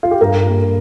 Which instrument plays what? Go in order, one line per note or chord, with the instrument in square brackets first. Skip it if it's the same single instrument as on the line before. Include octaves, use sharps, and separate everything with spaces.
[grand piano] F4
G4
G2 A#4
G3 A#3